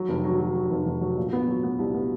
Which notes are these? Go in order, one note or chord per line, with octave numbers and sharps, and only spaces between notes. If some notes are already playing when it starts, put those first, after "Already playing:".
Already playing: F#3
F1
F#3
F#3
F#3
F1
F1
F#3
A#2
B3
F#3
B3
C2
B3